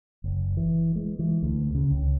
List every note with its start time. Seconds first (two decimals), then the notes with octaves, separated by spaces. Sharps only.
0.24 F#1
0.57 E3
0.96 G#3
1.19 E3
1.43 D2
1.75 C#3
1.91 C#2